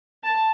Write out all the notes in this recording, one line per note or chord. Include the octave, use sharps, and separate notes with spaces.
A5